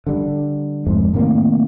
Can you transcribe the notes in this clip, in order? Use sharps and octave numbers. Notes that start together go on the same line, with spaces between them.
D3 G3
F2 G#2 G#3
A2 C3 D#3 A#3